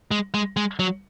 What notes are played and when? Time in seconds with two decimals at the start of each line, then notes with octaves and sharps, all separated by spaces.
0.11 G#3
0.34 G#3
0.57 G#3
0.79 F#3